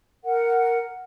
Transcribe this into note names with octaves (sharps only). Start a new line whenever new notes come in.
A#4 F#5